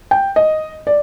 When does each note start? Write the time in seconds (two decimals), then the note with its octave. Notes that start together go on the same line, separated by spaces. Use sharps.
0.11 G5
0.36 D#5
0.87 D5